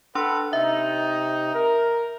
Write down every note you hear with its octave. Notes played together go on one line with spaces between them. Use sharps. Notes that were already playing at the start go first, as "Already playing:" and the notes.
D4 A4 B4 F#5 C6 E6
C3 D#4 E5
A#4